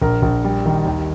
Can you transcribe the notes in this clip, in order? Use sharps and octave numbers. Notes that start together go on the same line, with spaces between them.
A#1 A#4
A#1
G3
D#3
D#2